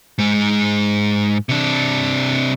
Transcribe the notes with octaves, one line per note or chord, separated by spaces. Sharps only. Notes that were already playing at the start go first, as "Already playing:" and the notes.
G#2 G#3
C3 D4